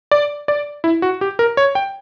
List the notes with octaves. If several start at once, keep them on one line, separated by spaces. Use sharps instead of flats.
D5
D5
E4
F#4
G4
A#4
C#5
G5